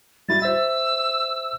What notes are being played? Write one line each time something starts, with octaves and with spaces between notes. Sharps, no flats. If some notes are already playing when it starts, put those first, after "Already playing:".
G3 E4 F#4 A6
C5 E5 E6